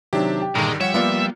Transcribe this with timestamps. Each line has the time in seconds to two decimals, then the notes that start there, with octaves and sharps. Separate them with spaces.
0.13 C3 D#3 F#3 D4 G4
0.41 G4
0.55 G2 A#2 D3 D#3 G#3 A#5 D6
0.81 F3 G3 C#5 E5 F#5 C#7
0.94 A#3 B3 F4 D5